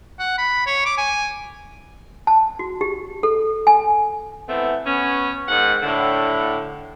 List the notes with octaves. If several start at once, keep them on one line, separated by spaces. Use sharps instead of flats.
F#5
B5
C#5
D6
G#5
A5
F#4
G4
A4
G#5
E3 A3 B3 C4
B3 C#4
G#2 D#3 F#5
A2 D3